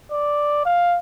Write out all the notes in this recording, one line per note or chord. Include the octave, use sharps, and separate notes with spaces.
D5
F5